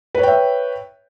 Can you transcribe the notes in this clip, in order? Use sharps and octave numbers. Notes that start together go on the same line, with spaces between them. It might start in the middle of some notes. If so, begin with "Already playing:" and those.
B4 C#5 E5 G5